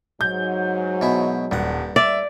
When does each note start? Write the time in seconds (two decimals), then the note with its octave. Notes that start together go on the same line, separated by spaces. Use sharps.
0.21 G#2 F#3 G6
1.01 B2 E4
1.51 D#1 G2 F#5
1.96 D5 E5